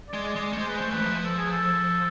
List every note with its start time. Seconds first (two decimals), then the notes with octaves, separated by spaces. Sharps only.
0.09 D5
0.14 G#3
0.25 D5
0.36 G#3
0.41 D5
0.53 A3
0.58 G#3 C5
0.68 B4
0.78 A3 C5
0.92 E3 B4
1.02 F3
1.24 A4
1.38 G#4
1.51 A4